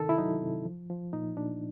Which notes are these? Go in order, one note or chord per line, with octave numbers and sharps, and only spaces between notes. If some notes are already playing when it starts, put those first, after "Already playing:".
Already playing: C3 D#3 A4
E4
F#3 D#4
C3
F3
F3
A#2 D#4
A#2 D4